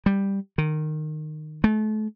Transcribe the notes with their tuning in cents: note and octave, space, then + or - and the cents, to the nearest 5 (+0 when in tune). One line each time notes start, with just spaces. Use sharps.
G3 +5
D#3 -20
A3 -35